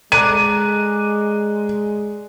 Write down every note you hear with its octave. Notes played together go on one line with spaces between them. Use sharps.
G#3 A4 D5 A#5 F#6 D#7